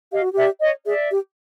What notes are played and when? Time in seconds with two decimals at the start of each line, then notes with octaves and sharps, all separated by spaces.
0.12 G4 D#5 F5
0.22 F#4
0.33 G4 D5 E5
0.61 C#5 D#5
0.86 G#4 D5 E5
1.11 G4